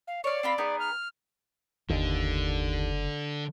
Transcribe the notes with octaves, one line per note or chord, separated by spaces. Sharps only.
F5
C#5 D5 F5
C4 F4 B5
B3 D#4 G#4
F6
F#1 D#2 D3